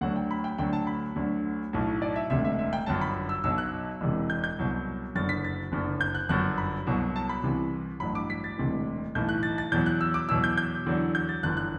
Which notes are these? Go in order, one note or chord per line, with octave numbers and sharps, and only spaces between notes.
D2 D3 F#3 F#5
G5
B5
G5
D2 D3 F#3 G5
A5
B5
D2 D3 F#3
B1 A2 F#3
D5
E5
E1 D2 C3 E5
E5
E5
G5
G1 F#2 F#3 A5
B5
E6
B1 B2 F#3 E6
F#6
E1 E2 C3
G6
G6
C2 B2 F#3
F#1 F#2 D3 F#3 A6
B6
A6
F#1 F#2 D3
G6
F#6
G1 F#2 F#3 F#6
B5
C2 B2 F#3
A5
B5
C2 C3 E3
A1 G2 F#3 B5
D6
B6
A6
E1 D2 C3 E3
B1 A2 E3 G6
F#6
A6
A6
E2 B2 F#3 G6
F#6
E6
D6
E2 B2 F#3 E6
G6
G6
E2 D3 F#3
G6
A6
G1 F#2 E3 F#6
F#6